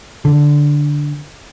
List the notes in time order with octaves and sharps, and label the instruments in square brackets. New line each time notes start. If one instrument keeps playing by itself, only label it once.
[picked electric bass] D3